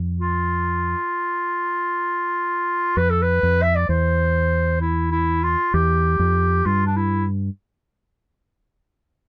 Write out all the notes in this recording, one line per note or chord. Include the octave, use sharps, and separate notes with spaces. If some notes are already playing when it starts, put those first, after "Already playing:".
Already playing: F2
F4
F2 B4
A4
B4
F2
E5
D5
E2 C5
E4
E4
F4
E2 G4
F2
G2 F4
D4
E4